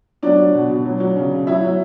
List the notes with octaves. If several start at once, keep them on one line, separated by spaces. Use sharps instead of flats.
F#3 D4 D5
F#3
B2
B2
F#3
F#3
C#3
C#3
F#3 E4 E5
F#3